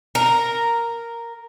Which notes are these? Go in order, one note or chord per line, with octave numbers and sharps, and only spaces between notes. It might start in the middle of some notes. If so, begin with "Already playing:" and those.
A#4